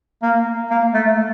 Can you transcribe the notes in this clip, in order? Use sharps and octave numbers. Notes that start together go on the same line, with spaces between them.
A#3
A#3
A3
A3